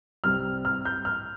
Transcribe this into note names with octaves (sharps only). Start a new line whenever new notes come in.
C2 C3 G3 C4 F6
F6
G6
F6